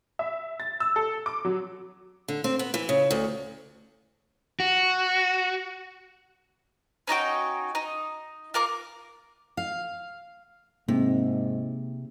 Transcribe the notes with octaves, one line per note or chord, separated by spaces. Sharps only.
E5
A6
E6
A4
D6
F#3
D3
C4
B3
E3
C#3
D2
F#4
C#4 D#4 F#4 G5
D#4
F4 A#4 D6
F5
G#2 C3 A#3